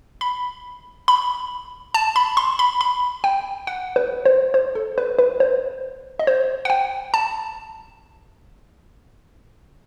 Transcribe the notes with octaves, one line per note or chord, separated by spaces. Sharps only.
B5
B5
A5
B5
C6
B5
B5
G5
F#5
B4
C5
C5
A4
B4
B4
C5
D#5
C5
F#5
G5
A5